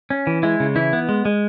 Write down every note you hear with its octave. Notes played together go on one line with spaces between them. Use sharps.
C#4
E3
G#3 E4
C#3
E3 E4
B3
G#3
G#3